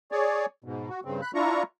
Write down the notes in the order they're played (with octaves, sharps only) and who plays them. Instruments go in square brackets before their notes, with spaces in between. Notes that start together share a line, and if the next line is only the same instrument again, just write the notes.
[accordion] G#4 C#5 D5
G#2 B2
F#4
G2 C#3 C4
B5 F#6
D4 E4 F4 A#5 C#6